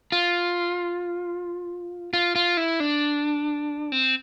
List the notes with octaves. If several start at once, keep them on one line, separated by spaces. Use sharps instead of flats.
F4
F4
F4
E4
D4
C4